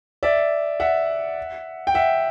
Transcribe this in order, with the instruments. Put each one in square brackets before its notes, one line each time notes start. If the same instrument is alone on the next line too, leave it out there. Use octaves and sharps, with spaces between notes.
[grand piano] D5 E5
E5 F#5
G5
E5 F#5